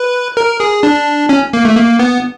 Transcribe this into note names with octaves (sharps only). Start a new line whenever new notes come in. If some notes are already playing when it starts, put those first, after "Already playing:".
Already playing: B4
A#4
G#4
D4
C#4
A#3
A3
A#3
B3